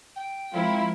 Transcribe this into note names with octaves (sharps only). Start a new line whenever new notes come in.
G5
F3 G#3 C4 E4 F4 A#4